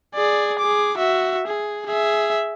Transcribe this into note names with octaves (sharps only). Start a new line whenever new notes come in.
G#4 D5
G#4 D6
F#4 E5
G#4
G#4 E5